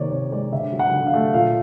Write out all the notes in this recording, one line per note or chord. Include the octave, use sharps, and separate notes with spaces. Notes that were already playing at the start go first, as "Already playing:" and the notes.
Already playing: C3 D#3 A#3 C#5 D5
C3 C#5
G#3 D5
D3 E5
F#3
F#5
D3
F5
A3
A#2 F5